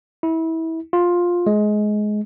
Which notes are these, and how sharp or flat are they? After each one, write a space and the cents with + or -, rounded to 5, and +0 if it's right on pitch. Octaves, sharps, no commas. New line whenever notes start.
E4 -25
F4 +10
G#3 +20